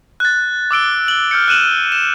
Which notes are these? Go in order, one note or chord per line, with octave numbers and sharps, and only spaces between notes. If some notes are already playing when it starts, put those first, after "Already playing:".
F#6 A6
D6 E6 D7 G7
F#7 G7
F6 G6 C#7
F#6 D#7 E7 F#7
E7